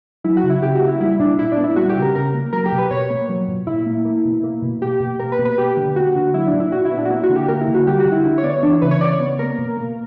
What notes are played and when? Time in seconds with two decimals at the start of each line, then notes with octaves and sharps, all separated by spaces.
0.24 F#3 E4
0.37 F#4
0.43 C#3
0.50 E4
0.62 C#3 G4
0.75 F#4
0.81 A#3
0.88 E4
1.01 G3 E4
1.19 A#2 D4
1.38 A#2 E4
1.52 D4
1.58 B3
1.64 E4
1.76 G3 F#4
1.89 G4
1.96 C#3
2.02 A#4
2.15 C#3 A#4
2.34 A#3
2.53 F#3 A#4
2.66 G4
2.72 B2
2.78 B4
2.91 B2 C#5
3.10 A#3
3.29 F#3
3.48 A#2
3.67 A#2 E4
3.86 A#3
4.05 A#3
4.25 B2
4.43 A#3
4.62 B2
4.82 A#3 G4
5.00 B2
5.19 A#3 A#4
5.32 B4
5.39 B2
5.45 B4
5.58 A#3 G4
5.77 D3
5.96 A#3 F#4
6.15 D3
6.34 F#3 E4
6.47 D4
6.53 A#2
6.60 E4
6.72 A#2 F#4
6.85 E4
6.91 B3
6.97 D4
7.05 F#4
7.10 A#3 E4
7.23 F#4
7.29 D3
7.36 G4
7.48 A#3 A#4
7.61 E4
7.68 D3
7.74 F#4
7.87 G3 G4
7.99 F#4
8.05 D3
8.12 E4
8.25 D3 E4
8.38 C#5
8.43 B3 D5
8.50 C#5
8.62 E3 D4
8.73 E4
8.82 C#3 B4
8.91 C#5
9.01 C#3 D5
9.13 C#5
9.20 B3
9.39 A#3 A#4
9.58 B2
9.77 A#3